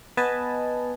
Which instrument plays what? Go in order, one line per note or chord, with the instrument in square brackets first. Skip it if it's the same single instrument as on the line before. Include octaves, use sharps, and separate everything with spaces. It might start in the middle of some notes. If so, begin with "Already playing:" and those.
[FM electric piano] B3 B4 D#5 G#5 A5